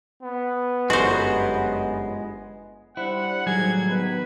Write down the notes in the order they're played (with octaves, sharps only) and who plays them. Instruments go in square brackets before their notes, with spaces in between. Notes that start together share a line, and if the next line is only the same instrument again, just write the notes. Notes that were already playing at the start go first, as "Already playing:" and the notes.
[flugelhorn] B3
[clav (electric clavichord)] G1 F#2 [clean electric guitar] G#3 [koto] F#4 C5
[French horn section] G3 D4 C5 [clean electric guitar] E4 [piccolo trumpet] F#5
[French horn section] A2 D#3 [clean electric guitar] F#3 G3 G#4 [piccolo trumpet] G#6
[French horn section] D#3 B3 [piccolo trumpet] B4